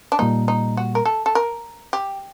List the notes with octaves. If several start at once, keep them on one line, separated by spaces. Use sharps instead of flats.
D4
A#2 G3 A#3 D#4
D#4
F#4
A#4
A4
A4
A#4
G4